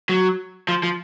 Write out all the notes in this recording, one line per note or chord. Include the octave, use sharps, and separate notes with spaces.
F#3
F3
F3